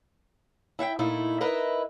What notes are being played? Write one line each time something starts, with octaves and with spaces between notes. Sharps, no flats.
E4 E5 F#5 G5
A#2 A3 D#4 E4
D#4 E4 A#4 B4 D#5 E5